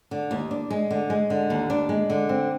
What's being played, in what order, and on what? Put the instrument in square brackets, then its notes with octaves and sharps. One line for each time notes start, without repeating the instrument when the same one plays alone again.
[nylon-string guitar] D3
D#2
D4
G#3
D3
G#3
D3
D#2
D4
G#3
D3
C4